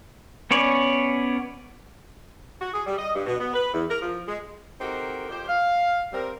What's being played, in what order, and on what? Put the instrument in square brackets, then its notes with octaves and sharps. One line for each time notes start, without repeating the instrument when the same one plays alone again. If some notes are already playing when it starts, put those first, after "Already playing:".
[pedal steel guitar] B3 C#4 C#5 D5
[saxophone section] F#4
G#4
G3
D#5
G2
B2
B3
B4
E2
A#4
F3
G#3
C4 D#4 F#4 G4 A4 A#4
F2 G4 C5
F5
G3 C4 A#4